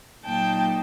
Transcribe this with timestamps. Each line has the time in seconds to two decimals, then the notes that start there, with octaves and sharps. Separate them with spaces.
0.25 A#2 F#3 A#3 D#4 G5 A5